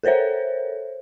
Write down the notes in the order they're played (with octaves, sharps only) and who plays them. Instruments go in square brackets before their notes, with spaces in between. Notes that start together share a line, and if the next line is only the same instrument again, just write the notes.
[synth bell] A4 A#4 C5 C#5 E5